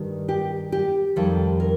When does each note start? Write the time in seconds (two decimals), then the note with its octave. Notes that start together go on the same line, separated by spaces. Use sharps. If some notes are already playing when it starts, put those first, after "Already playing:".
Already playing: G2 D#3 G3
0.29 G4
0.72 G4
1.16 F2 D#3 G3 A4
1.60 A#4